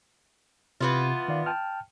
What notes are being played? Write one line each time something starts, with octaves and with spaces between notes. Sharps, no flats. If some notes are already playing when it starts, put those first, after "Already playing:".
C3 E3 B3 F4
D#3 D5 F5
G5 A5 F6